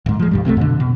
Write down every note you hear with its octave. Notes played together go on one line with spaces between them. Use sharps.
D1 G#2
F3 G#3
B1 G2 G3
C2 C3 G3 A3
F2 B2 D3
B2